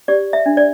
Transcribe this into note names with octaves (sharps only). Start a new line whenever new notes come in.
G4 D5
E5
D4
D5